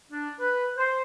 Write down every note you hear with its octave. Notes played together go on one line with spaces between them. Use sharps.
D4
B4
C5